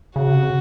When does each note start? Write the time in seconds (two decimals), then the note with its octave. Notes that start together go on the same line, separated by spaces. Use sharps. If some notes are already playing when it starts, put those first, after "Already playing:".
0.16 C#3 F#4
0.34 C3